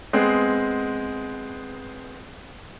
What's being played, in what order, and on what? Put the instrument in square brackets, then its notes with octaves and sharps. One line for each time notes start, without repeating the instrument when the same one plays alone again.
[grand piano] G#3 B3 C4 G#4